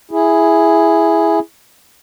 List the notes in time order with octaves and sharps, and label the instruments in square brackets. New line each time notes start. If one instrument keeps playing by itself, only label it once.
[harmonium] E4 G#4